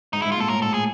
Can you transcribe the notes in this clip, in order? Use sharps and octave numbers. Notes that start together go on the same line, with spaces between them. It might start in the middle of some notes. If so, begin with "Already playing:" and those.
G#2 D#4
E4
G#2
F4
A#2 A4
A2 A#4
G#2 A4
A2 G#4